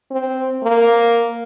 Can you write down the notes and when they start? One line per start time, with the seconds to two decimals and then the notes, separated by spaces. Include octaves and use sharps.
0.11 C4
0.64 A#3